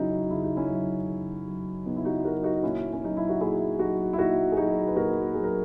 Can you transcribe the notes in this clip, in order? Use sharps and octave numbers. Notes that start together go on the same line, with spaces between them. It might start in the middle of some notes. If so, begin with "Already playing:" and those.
Already playing: C#3 F#3 C#4 D#4 E4 F#4
C#3 E4
D#4
C#4 E4
F#3
C#3
F#3
C#3 B3 D#4
E4
D#4 F#4
F#3 F#4 A#4
D#4 F#4
A#2 C#4 E4
C#4
F#3 D#4
E4
F#4
A#2 E4 G#4
F#3 D#4 F#4
E4
A#2 D#4 F#4
G#4
F#3 D#4 F#4
B4
A#2 F#4 A#4
F#3 G#4
A#4